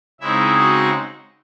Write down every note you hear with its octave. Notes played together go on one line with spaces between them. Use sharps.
C#3 G#3 C4 D#4 E4 E5
F#4 F#5